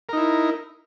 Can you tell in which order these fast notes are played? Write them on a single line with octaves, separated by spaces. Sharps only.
A#4 D#4 E4